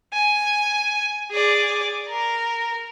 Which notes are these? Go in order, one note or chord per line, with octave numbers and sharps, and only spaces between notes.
G#5
G#4 D5
A#4